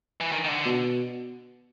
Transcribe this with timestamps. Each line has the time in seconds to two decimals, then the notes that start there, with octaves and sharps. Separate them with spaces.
0.20 E3
0.32 D#3
0.44 D#3
0.48 D3
0.66 B2